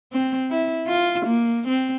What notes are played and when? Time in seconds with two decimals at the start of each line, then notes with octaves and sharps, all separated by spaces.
0.13 C4
0.51 E4
0.87 F4
1.26 A#3
1.68 C4